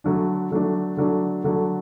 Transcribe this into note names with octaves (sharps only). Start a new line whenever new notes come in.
D3 F#3 A3 D4
D3 F#3 A3 D4
D3 F#3 A3 D4
D3 F#3 A3 D4